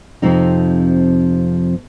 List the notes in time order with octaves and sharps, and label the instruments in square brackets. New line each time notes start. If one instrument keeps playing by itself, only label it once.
[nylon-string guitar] F2 C3 F3 C4 D#4